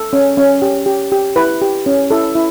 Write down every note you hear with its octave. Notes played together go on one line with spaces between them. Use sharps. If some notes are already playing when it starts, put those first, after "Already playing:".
Already playing: A4
C#4
C#4
G4
G4
G4
E4 B4
G4
C#4
E4 A4
E4